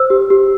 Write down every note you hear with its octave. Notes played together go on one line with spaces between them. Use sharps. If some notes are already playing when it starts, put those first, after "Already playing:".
Already playing: C5 E6
G4
G4